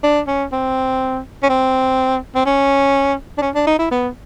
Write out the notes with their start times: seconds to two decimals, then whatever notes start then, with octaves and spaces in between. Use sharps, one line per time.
0.04 D4
0.27 C#4
0.52 C4
1.43 C#4
1.49 C4
2.35 C4
2.46 C#4
3.38 D4
3.42 C#4
3.55 D4
3.67 D#4
3.79 E4
3.91 B3